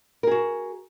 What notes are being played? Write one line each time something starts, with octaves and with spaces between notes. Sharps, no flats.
F#4 G#4 A#4